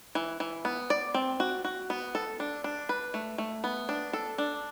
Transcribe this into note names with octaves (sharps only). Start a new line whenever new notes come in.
E3
E3
B3
D5
C4
F#4
F#4
B3
A4
D4
D4
B4
A3
A3
B3
D4
A4
D4